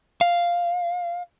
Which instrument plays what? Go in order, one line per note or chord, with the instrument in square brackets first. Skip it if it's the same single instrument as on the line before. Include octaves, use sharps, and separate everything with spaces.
[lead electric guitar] F5